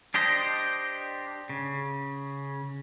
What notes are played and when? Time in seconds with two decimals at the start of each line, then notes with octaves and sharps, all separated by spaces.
0.14 D4 G4 C5 D#5
1.49 C#3